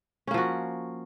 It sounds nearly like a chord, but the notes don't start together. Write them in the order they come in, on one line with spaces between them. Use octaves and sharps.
C#4 A#3 F3 F#4